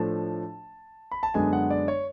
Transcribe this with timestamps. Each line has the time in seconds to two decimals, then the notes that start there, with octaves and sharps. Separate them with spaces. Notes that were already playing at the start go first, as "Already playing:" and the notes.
Already playing: A2 F3 A3 D4 A5
1.12 B5
1.23 A5
1.34 F#2 D3 G#3 B3 D4 G#5
1.53 F#5
1.70 D5
1.88 C#5